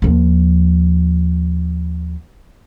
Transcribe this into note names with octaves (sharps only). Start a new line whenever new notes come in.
D#2 F3